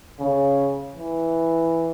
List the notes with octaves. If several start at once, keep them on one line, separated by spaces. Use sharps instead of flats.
C#3
E3